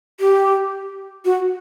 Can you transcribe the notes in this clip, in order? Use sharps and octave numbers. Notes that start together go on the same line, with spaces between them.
G4
F#4